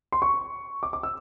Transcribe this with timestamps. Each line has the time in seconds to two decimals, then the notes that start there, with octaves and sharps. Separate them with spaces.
0.12 C6
0.22 C#6
0.83 D6
0.93 D6
1.03 E6